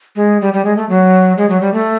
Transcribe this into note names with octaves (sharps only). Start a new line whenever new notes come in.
G#3
G3
G3
G#3
A3
F#3
G#3
F#3
G3
A3